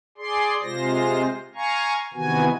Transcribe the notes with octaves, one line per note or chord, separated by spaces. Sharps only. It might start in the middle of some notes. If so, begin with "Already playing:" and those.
G#4 D5 C6
C3 G#3 F4 C5 A#6
F5 G#5 A#5 C#6
C3 D#3 E3 B3 F#4 G#5